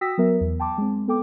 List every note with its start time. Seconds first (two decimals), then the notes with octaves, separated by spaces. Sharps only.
0.01 F#4 G5 D#6 E6 A#6 B6
0.18 F#3 B3 A#4 E5
0.41 E2
0.60 G5 A5 C6 D6
0.78 G#3 C4
1.08 B3 A4 G5 D6